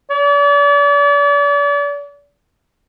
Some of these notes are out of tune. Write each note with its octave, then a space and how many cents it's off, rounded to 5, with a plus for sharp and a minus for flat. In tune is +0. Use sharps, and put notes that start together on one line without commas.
D5 -40